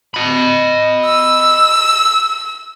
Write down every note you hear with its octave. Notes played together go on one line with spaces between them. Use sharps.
D#5 B5
E6